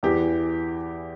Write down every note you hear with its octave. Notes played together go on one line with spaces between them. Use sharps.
E2 E3 G4